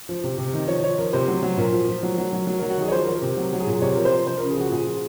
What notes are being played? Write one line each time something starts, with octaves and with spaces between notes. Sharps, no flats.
F3
C3
C3
D#3
F3 C#5
F3 C#5
F3 A#4
C3 C5
F#3
F#3
A#2 A#4
F3
F3
F#3
F#3
F#3
F#3
F#3 A#4
F#4
D#3 G#4
C#5
F3 C5
A#4
F3
A#4
C3
F#3
F#3
G#4
A#2
C3 C#5
F3 A#4
C5
F3
F3 C5
C#3 A#4
G#4
F3 F#4
A#2 G#4
F3